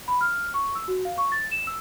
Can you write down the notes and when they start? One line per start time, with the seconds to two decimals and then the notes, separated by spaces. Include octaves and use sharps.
0.08 B5
0.21 F6
0.54 C#6
0.75 E6
0.88 F#4
1.05 F5
1.18 C#6
1.32 A6
1.51 E7
1.67 E6